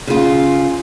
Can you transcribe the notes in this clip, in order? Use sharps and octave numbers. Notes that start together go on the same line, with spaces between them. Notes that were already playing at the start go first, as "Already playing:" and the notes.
C#3 F4